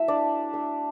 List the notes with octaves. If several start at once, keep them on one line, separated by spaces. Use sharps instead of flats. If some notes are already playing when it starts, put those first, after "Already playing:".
Already playing: F#3 A3 E4 E5
D4 D5
A3 D4